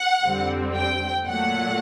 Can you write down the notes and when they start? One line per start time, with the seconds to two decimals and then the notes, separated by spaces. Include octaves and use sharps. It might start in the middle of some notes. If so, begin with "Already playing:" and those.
Already playing: F#5
0.23 F2 D3 G3 C4
0.76 G5
1.26 A#2 F#3 A3 F#5